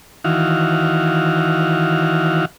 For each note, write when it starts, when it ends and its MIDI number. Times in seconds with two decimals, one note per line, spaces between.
0.24 2.45 51
0.24 2.45 52
0.24 2.45 66
0.24 2.45 77